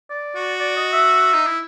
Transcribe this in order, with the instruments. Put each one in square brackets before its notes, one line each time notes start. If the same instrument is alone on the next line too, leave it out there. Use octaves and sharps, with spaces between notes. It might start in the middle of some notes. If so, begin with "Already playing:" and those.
[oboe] D5
[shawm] F#4
[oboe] D5
D#5
E5
[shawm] D#4
E4